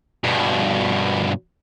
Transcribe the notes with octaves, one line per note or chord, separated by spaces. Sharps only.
G2 B2